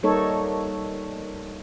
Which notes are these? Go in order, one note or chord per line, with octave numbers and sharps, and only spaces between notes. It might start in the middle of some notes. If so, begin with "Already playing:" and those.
G3 A#3 D#4 A4 C#5